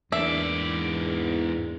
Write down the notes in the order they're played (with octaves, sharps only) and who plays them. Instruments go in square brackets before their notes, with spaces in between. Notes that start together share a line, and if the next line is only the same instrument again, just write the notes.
[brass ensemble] E2 [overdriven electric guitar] G#2 D5 [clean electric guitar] A#3 D4 [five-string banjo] E5